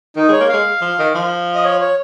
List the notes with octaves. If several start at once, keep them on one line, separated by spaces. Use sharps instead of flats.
D#3 D#4
G#3 C#5
A#3
G#3 F5
F3
D#3
F3
D#5
C#5
C#5